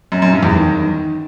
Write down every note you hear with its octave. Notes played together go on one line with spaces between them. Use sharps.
F#2
F#2
G2
E2
D#3